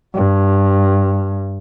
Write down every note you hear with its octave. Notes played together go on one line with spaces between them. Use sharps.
G2